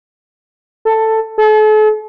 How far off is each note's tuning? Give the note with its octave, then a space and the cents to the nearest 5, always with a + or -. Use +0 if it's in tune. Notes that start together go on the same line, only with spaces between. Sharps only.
A4 +10
A4 -40